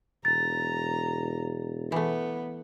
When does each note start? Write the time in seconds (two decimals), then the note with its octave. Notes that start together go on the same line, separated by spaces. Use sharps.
0.25 E1 A#5 A6
1.92 E3 A3 B3